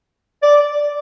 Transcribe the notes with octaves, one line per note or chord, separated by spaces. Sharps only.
D5